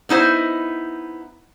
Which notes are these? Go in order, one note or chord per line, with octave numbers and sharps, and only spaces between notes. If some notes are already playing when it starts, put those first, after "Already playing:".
B3 D#4 E4 C5